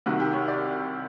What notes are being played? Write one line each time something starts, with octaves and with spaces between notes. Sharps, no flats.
C2 C3 D#3 F#4
G4
C#5
D5